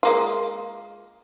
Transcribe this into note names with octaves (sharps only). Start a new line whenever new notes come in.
G#3 A#3 F4